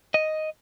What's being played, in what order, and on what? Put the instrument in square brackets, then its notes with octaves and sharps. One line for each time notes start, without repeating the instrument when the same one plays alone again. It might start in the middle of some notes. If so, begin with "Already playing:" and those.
[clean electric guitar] D#5